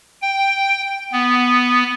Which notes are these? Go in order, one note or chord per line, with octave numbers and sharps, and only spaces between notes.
G5
B3